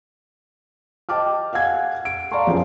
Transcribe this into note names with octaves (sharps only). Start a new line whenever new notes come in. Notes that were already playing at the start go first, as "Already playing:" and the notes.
D#5 G5 A5 D6 F6
F5 F#5 G#5 G#6
D7
D5 F5 A5 A#5 C6 C#6
A#1 F#2 F3 B3 G#4 F5